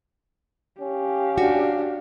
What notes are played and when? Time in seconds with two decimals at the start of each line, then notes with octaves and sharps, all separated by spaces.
0.80 C#4 G4 F5
1.38 D4 F#4